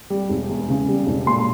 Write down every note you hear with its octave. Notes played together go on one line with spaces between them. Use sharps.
G3
E1
E2
C#3
G3
E1
A#2 C6